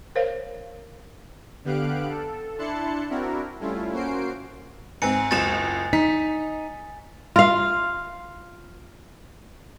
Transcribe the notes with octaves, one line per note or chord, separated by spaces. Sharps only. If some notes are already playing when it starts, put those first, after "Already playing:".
A#4 C5 C#5 F5
D3 B3 G4 F5 F#6 D7
A4
D4 E4 A5 C6 F#6 C#7
C4 D4 E4 F#4 A#4
G3 A3 C#4 E4 F4
A#3 C#4 F#4 C5 C7 D7
G#2 C4 G#5 C#7
F#1 C#2 A6 E7
D#4 B6
F4 F5